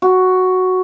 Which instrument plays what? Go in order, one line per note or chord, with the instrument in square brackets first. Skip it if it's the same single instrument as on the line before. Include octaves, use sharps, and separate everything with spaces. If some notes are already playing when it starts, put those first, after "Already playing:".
[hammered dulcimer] F#4